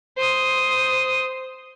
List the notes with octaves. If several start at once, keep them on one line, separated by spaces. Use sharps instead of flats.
C5 D#6